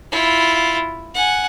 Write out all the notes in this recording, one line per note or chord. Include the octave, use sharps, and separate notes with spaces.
E4 F4
F#5 G#5